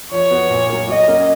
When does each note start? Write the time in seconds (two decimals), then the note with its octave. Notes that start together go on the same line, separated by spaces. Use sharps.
0.11 F3 C#5
0.31 B3 F#4
0.50 A#2
0.69 F#3 A#3
0.88 F#3 D#5
1.08 A#3 C#4 F#4